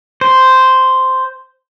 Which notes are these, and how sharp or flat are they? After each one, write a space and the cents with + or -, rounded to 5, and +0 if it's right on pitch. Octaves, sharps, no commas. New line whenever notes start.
C5 -5